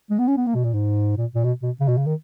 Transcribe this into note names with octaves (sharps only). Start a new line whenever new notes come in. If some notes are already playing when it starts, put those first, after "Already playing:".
G#3
B3
C#4
B3
A#3
B2
A#2
G#2
A#2
A#2
B2
B2
C#3
B2
C#3
D#3